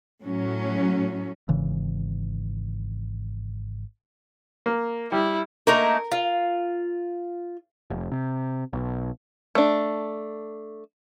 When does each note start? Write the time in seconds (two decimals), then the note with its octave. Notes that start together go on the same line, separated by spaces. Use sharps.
0.24 A2 F#3 C#4
1.49 G#1 C#3 E3
4.66 A#3
5.12 G3 E4
5.67 A3 A#3 D#4 A#4
6.12 F4
7.90 F1
8.12 C3
8.73 B1
9.55 A3 D4